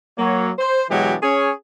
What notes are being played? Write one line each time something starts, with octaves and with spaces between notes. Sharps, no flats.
F#3 A#3 C#5
C5
B2 E3 F#3 G#3 D4 G4
C#4 G#4 C#5